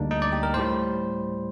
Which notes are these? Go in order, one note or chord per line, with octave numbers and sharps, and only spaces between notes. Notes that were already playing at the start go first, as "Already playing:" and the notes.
Already playing: D2 D3 G3 A#3 D4 D#4
D#4
D5
G4
A#4
A2 G3 C5